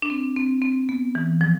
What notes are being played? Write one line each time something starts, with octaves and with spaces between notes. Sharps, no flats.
D4
C4
C4
C4
B3
E3
F3